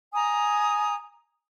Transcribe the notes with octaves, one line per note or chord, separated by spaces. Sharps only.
G#5 A#5 D#6